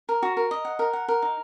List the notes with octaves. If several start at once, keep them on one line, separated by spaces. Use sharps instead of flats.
A#4
F#4
A#4
D#5
F#5
A#4
F#5
A#4
D#4